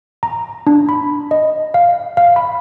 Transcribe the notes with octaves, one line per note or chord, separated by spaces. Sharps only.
A#5
D4
B5
D#5
F5
F5
B5